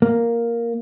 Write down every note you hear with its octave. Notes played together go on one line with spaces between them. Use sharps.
A#3